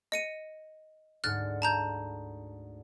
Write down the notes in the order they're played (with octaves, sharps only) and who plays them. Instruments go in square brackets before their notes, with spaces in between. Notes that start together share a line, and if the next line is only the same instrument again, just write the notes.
[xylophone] D#5 C#7 D#7
[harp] D2 G#2 F#5 [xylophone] F6 F#6 A6
[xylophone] A5 A#5 G6